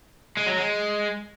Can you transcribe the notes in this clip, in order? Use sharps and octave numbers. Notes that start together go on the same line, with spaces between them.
G#3
F#3
G#3